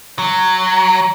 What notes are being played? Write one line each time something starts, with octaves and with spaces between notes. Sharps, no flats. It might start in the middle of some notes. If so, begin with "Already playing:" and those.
F#3